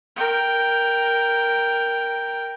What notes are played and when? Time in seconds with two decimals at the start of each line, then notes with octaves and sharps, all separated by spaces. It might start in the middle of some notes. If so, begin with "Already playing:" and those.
0.16 A#4 G5